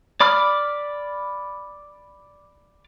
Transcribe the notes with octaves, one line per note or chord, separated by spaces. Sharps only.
D5 B5 D6 F6